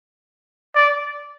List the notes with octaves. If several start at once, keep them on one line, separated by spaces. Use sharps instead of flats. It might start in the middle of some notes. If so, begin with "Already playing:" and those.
D5